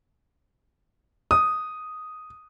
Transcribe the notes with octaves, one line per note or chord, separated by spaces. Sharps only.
D#6